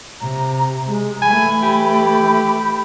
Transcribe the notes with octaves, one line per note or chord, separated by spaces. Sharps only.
C3 A#5
G#3
E3 A3 G#5 B5
G4